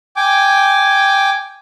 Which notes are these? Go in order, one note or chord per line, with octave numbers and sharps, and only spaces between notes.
G5 G#5 D6